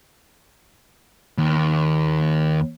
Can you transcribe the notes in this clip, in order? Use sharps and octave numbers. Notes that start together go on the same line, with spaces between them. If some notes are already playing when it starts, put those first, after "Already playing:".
D#2